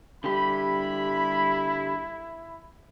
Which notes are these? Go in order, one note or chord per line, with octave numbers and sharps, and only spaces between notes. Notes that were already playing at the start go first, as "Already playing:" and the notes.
D3 G3 E4 G4 B5